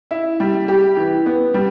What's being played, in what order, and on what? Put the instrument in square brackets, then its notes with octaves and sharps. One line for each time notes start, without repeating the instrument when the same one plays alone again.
[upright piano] E4
G3
G4
E3
B3
G3